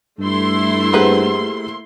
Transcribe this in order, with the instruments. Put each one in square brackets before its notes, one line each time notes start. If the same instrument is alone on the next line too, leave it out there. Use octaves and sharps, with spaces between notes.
[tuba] G2 [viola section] A3 E4 C6
[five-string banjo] A#3 B4 C5 [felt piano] G4 G#4 F#5